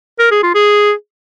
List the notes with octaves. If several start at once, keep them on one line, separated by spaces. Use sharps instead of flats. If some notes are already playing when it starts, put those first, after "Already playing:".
A#4
G#4
F4
G#4